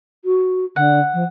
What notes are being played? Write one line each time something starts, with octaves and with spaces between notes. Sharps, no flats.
F#4
D3 F#5
F3